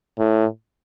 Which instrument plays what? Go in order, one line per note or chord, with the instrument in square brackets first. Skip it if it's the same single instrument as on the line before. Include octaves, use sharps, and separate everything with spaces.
[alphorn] A2